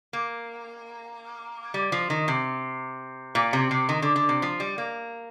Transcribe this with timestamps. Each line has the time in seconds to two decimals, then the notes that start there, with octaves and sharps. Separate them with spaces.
0.13 A#3
1.74 G3
1.92 F3
2.10 D#3
2.28 C3
3.35 A#2
3.53 C3
3.71 C3
3.89 D#3
4.02 D3
4.16 D3
4.29 C3
4.42 F3
4.60 G3
4.78 A#3